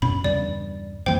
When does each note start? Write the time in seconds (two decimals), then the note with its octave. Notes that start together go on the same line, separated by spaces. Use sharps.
0.02 F#2 B2 C#4 B5
0.24 E2 G2 C#3 D5
1.06 F2 E3 A#3 C5 G5